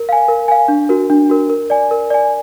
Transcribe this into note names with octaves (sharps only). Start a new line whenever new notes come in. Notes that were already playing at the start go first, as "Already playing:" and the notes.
Already playing: A#4
F5 G#5
A#4
F5 G#5
D4
F#4 A#4
D4
F#4 A#4
A#4
D5 G#5
A#4
D5 G#5